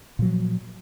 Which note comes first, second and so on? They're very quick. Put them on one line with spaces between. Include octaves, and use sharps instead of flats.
A#2 F#3 F3